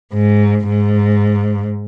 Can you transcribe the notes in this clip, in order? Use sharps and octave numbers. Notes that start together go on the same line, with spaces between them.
G#2
G#2